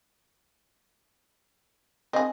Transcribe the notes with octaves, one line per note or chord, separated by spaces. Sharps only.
C4 G#4 D#5